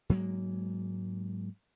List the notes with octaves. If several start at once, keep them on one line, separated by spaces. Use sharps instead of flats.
G#2 F#3 G#3 A#3